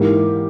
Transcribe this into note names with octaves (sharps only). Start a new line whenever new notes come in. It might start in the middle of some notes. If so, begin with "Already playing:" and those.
Already playing: G#2 E3 A#3 G4